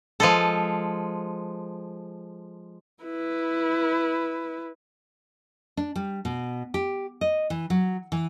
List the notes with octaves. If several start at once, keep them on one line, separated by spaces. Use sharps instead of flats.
F3 G#3 A4
E4 B4
D4
G3
B2
G4
D#5
E3
F#3
E3